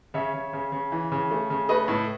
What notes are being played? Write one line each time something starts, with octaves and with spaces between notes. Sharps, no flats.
C#3 C#5 E5
C#3
C#3
C#3
E3
C#3
A3
C#3
A3 B4 D#5
A2